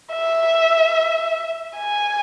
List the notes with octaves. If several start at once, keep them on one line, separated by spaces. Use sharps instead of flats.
E5
G#5